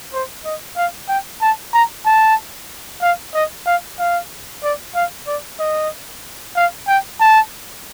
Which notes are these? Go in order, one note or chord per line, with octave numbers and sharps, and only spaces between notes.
C5
D#5
F5
G5
A5
A#5
A5
F5
D#5
F5
F5
D5
F5
D5
D#5
F5
G5
A5